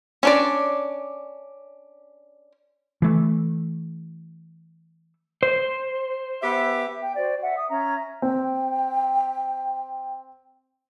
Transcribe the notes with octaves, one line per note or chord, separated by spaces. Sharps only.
C#4 D4 D5
E3 A3
C5
B3 G4 E5
G5
F#4 C5 D5
E5 F#5
D#6
C#4 E5 A#5
C4 G5